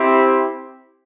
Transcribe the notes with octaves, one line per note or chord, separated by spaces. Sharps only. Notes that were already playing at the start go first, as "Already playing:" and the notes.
Already playing: C4 E4 G4 C5 E5